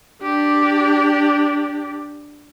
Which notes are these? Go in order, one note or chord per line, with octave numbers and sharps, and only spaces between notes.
D4 G4